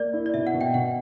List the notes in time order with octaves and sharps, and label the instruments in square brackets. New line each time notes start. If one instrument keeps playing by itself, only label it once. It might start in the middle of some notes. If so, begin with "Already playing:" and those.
Already playing: [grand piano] A#3 [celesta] D5
[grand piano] E4
[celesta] D5
[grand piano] B2 [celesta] E5
[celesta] F#5
[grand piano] B2
[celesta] G5
[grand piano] B2 [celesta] F#5